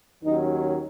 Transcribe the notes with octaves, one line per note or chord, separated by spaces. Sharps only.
D#2 D#3 F#3 C#4 D#4